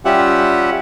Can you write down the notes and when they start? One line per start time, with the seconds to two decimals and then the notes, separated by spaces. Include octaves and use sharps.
0.05 G3 C#4 F4 G4 E5 F#5